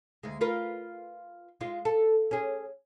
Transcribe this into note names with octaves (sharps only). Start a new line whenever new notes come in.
D2 G#3
F4 A#4 B4
G#3 F4
A4
C#4 G#4